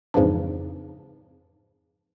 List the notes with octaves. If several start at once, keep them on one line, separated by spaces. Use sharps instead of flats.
F2 G#2 C#3 E3 F3 D4